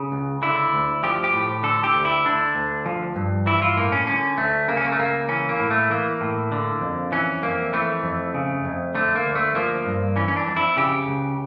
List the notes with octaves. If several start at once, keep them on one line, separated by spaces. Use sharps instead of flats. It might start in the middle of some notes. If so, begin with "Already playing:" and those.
Already playing: C#3
C#2
D3 E4
D2
F3 G4
G4
A2
D3 A4
G4
D2
E4
D3 D4
D2
F3
G2
E3 E4
F4
A2 A#3
C#4
D3 C#4
D2 A3
C#3 A#3
C#4
A#3
A3
C#2 A#3
E3 C#4
A#3
A2
A3
E3 A#3
A2
D3
F2
E3 C#4
F2 A#3
E3 A3
F2
C#3
F2
D3 A3
A#3
D2
A3
F3 A#3
G2
E3 C#4
C#4
D4
F2
E4
C#3 G4
C#2